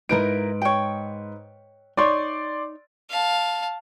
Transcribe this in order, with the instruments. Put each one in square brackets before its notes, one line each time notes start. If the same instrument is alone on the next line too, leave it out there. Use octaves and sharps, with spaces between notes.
[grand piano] G#2 B4 D7 [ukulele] D#4 E4 A#4
[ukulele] C#5 G5
[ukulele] D#4 C#5 [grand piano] D5 C6
[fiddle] F5 A5